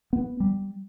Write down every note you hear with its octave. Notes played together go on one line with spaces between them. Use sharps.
B3
G3